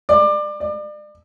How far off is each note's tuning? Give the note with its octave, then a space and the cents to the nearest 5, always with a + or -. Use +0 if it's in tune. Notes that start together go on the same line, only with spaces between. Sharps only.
D5 +25
D5 +35